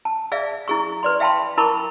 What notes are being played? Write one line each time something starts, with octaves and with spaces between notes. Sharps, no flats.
A5
G#4 D5 E5 F5
E4 G#4 C#6
B4 D5 C6
E5 F5 G5 A5 B5 C6
E4 A#4 A5 B5 C#6 D6